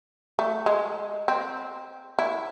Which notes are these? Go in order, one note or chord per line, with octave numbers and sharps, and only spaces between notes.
A3
G#3
C4
E4